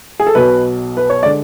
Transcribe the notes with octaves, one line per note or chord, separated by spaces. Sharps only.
G#4
A4
B1 B2 F#3 B4
B4
C#5
D5
D3 G#3